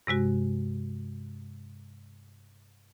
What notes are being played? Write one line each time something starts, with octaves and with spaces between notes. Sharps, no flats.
G2 C3 G#3 F#4